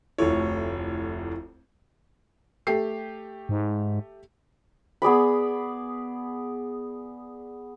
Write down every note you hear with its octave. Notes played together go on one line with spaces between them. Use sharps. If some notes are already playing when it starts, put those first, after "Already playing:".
F1 D2 E4 F4 A4 C#5
A3 G4 C7
G#2
B3 G#4 D5 B5